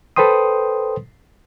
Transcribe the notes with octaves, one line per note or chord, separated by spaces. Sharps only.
A4 B4 C5 G5 C6 D#6